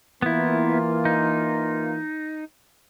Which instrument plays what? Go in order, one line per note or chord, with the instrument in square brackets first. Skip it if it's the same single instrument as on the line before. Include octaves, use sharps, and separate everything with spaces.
[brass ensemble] E3 A#3 F4 [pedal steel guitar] B3 E4
[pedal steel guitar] D#4